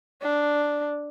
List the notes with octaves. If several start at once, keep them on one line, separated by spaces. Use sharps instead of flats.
D4